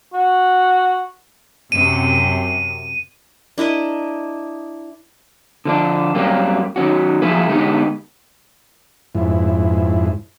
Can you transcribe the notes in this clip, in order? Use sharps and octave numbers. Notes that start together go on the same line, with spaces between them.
F#4
F#2 C3 D#7
D4 E4 A#4 D#5
D3 F3 D4
F#2 F#3 G3 A#3 C4
D#3 F#3 C#4 F#4
F3 F#3 A#3 E4 G#4 B4
D3 G#3 B3 D#4 G4
F2 G#2 E4